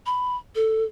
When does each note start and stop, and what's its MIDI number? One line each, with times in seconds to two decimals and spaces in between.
0.06 0.36 83
0.55 0.84 69